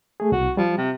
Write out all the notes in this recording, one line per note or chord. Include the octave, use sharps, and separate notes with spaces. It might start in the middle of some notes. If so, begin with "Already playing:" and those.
A3 G#4
C2 F#4
F3 G3
C3